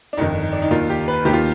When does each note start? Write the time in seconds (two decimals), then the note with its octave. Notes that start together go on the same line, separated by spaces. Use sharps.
0.13 D4
0.17 G1 F2 D#3 D#4
0.52 D4
0.62 D#4
0.71 D#2 D#3 F4
0.90 G4
1.08 B4
1.25 D#2 D#3 G4
1.33 F4